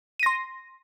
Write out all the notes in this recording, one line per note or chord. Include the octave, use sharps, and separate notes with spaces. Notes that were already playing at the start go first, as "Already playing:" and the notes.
C6 A#6 D#7